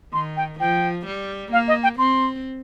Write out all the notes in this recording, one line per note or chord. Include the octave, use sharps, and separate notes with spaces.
D#3 C6
G5
F3 G5
G3
A#3 F5
D#5
G5
C4 C6